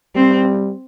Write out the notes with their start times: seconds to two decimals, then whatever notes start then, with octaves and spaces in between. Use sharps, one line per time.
0.15 G3 C4